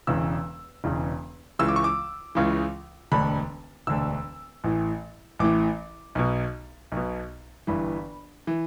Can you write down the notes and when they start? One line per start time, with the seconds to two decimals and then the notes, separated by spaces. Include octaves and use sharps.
0.07 E1 E2 C#3 E6
0.84 E1 E2 C#3
1.59 C#2 C#3 E3 E6
1.68 D6
1.76 C#6
1.84 D6
2.35 C#2 C#3 E3
3.12 E1 D2 D3 B5
3.87 E1 D2 D3 E6
4.64 A1 A2 E3
5.39 A1 A2 E3 D6
6.15 B1 B2
6.92 B1 B2
7.67 G1 G2 E3 B5
8.47 E3